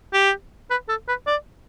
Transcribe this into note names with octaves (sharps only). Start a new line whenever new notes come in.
G4
B4
A4
B4
D5